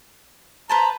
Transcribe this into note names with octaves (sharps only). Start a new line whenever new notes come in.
B4 C5 A5 A#5